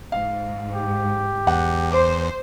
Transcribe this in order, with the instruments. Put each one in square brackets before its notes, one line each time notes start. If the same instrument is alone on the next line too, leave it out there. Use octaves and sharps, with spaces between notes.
[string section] G#2 [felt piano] F5
[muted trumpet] G4
[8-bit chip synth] E2 [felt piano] F#5
[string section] C5 [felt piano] D6